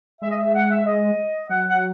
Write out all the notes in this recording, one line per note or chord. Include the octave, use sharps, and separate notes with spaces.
G#3 E5
D#5
E5
F#5
E5
D#5
F#3 F#5
F#5